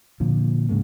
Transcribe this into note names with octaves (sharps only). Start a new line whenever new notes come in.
A#2 D3 F3
G#2 C#3 G#3 A#3